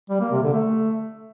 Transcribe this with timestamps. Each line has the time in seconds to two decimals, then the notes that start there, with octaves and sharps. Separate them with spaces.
0.10 G3
0.21 A#3
0.32 C3
0.43 D3
0.54 A3